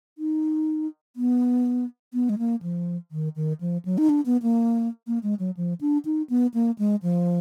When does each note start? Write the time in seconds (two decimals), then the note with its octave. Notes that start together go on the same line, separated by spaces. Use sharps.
0.18 D#4
1.16 B3
2.14 B3
2.29 G#3
2.38 A#3
2.62 F3
3.12 D#3
3.36 D#3
3.61 F3
3.85 F#3
3.98 D#4
4.09 D4
4.26 B3
4.42 A#3
5.07 A#3
5.23 G#3
5.39 F#3
5.57 F3
5.81 D4
6.05 D#4
6.30 B3
6.54 A#3
6.79 G#3
7.03 F3